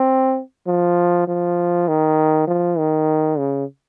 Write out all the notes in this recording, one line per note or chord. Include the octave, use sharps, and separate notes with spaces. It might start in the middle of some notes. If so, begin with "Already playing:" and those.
Already playing: C4
F3
F3
D#3
F3
D#3
C#3